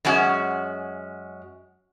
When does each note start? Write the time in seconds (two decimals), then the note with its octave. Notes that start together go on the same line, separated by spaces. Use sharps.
0.05 F#2 G#3 C#4 F#4